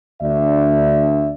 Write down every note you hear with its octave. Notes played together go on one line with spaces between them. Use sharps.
D2 D4 D5 E5